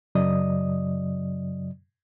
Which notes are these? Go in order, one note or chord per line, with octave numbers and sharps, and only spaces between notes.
F#2 C#3 F#3 D5 D#5 D#6